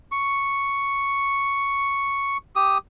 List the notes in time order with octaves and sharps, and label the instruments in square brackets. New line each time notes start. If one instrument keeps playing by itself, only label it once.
[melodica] C#6
G4 D#6